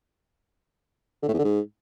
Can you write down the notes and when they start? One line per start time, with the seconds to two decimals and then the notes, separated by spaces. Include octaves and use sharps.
1.23 D3
1.28 A2
1.34 E2
1.39 D3
1.44 G#2